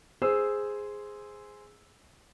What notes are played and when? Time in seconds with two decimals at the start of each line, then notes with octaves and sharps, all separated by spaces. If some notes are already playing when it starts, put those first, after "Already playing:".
0.22 G#4 C5 E6